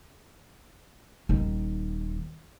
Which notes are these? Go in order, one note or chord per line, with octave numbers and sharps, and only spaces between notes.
D#1 D#3